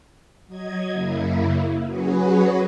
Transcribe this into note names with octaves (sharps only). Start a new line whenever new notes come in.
F#3 D#5 G#6
F#2 C#3 A#3 E4
F#3 C#4 F#4 G#4 B4